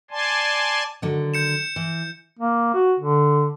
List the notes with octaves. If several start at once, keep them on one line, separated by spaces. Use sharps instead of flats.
D5 G#5 A5 C6
D3 D#3 F#3
G6 C#7 E7
E3
A#3
F#4
D3